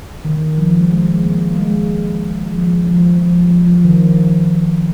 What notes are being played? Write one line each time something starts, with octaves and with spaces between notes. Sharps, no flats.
D#3
F3
G#3
G#3
A#3
G#3
F3
F3
F3
F3
F3
F3
D#3